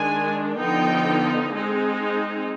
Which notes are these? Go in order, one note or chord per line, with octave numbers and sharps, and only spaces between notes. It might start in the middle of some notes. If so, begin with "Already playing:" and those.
Already playing: D#3 G#3 D4 G#5
D3 F3 B3 D#4 G5
G#3 C4 D#4